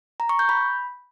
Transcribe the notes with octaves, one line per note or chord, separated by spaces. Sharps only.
A#5
C#6
G6
B5